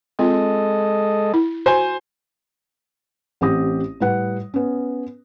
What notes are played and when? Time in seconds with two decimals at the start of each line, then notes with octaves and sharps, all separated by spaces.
0.19 G#3 C4 F4 A4 D#5
1.34 E4
1.66 F#4 C5 G#5
3.41 A1 C4 G4 D#6 A#6
4.00 A2 G3 B4 F#5
4.54 B3 C#4